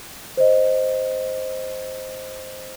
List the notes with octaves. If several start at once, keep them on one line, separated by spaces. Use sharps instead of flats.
C5 D#5